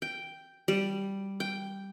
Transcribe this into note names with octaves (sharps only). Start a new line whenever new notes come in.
G5
G3
G5